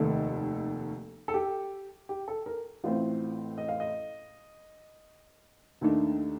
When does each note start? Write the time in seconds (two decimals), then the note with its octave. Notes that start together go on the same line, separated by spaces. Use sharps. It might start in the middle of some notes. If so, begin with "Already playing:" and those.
Already playing: F1 D#2 D#3 A3 A4
1.28 A4
1.34 G4
2.09 G4
2.28 A4
2.46 A#4
2.84 A1 A2 A3 C4 F4
3.58 D#5
3.69 F5
3.80 D#5
5.81 D#2 D#3 A3 D4